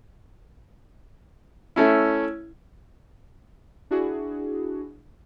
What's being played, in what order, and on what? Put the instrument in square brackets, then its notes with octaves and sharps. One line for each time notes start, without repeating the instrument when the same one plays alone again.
[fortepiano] A3 C#4 E4
[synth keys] D4 E4 F#4 G#4